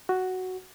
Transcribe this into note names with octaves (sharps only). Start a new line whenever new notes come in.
F#4